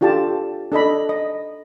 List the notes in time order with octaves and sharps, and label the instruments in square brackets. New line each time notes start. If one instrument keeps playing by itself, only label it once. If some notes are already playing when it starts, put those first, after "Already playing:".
[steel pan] D4 F4 G4 A4 A5
D4 A4 D#5 B5
D#5